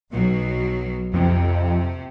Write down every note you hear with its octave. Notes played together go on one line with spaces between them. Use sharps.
B1 B2 F#3
F2 C3